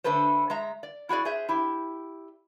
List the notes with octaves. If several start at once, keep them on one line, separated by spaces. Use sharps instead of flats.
D3 A3 A4 B4 C5
G#3 E5 A#5
D5
E4 F#4 G#4 D5
G#4 C5 E5
E4 G4